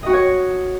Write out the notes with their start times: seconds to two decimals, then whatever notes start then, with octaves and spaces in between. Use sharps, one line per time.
0.03 D#5
0.06 F#4
0.10 F#5
0.13 C#5